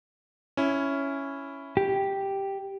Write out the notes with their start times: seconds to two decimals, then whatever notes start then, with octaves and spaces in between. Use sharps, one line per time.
0.57 C#4 E4
1.77 G4